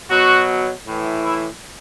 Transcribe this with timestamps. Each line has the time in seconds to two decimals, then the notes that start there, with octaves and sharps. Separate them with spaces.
0.10 B2 F#3 F#4
0.86 A2 E3
1.24 E4